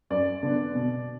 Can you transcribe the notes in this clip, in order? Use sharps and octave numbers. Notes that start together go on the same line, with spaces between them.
F#2 D5
D3 B3
B2